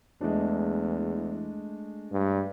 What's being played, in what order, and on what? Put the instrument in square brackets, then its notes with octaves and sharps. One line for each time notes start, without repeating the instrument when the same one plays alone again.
[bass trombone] E2 [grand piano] G#3 A3 D4
[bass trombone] G2